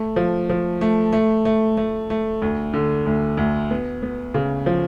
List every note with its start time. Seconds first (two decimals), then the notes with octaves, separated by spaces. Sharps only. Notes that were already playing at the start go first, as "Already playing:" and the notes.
Already playing: A3
0.16 F3
0.50 F3
0.81 A3
1.13 A3
1.45 A3
1.77 A3
2.10 A3
2.42 D2
2.74 D3
3.06 D2
3.37 D2
3.71 B3
4.03 B3
4.34 C#3
4.66 F3